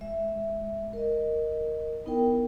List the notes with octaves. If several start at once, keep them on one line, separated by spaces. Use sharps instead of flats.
G#3 E5
A#4 D#5
B3 D#4 E4 A#4 G5